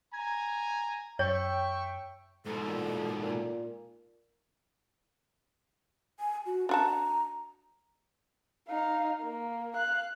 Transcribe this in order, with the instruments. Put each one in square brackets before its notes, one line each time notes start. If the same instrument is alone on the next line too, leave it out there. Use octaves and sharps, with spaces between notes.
[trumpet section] G#5 A#5 [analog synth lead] G#6
[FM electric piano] F#2 [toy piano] C#5 [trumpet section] E5 C#6 [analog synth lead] G5
[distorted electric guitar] G#2 B2 [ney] A4
[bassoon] A#2
A#2
[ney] G#5
F#4
[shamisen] D4 F#4 A5 [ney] A#5
[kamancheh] D#4 F5
A#3
F5 F#6